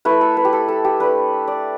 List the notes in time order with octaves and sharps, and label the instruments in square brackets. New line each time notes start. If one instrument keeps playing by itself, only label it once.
[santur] A3 E4 B4
A4
B4
G4
A4
A4
G4
A3 D4 B4
D5